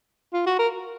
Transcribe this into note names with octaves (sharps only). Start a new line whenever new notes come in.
F4
F#4
A#4